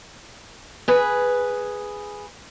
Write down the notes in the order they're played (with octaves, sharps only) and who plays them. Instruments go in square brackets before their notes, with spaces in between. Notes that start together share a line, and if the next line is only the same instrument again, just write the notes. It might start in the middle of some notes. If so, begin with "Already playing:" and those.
[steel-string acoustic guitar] G#4 B4